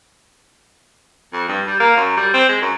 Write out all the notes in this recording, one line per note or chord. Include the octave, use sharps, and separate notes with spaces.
F2
G2
G3
A#3
F#2
G3
C4
G#3
F#2